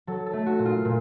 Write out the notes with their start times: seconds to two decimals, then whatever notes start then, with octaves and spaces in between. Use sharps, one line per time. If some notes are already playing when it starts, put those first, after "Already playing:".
0.07 F#3 A4
0.26 A4
0.33 A3
0.46 F#4
0.59 A#2
0.65 F4
0.85 A#2